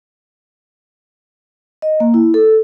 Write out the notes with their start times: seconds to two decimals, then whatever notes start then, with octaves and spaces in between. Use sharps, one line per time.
1.82 D#5
2.00 A#3
2.14 E4
2.34 A4